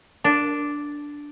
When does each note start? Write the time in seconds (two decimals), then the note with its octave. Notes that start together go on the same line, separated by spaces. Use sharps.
0.24 D4